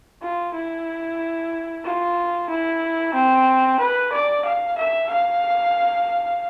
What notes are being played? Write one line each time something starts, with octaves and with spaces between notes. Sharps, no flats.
F4
E4
F4
E4
C4
B4
D5
F5
E5
F5